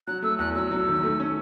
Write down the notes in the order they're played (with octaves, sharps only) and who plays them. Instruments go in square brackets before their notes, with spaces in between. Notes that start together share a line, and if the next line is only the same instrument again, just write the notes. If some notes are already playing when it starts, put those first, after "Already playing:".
[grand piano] F#3 [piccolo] F#6
[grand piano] A3 [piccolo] E6
[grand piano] E2 [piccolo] F#6
[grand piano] F#3 [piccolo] E6
[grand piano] F#3
D#3
A3
C#4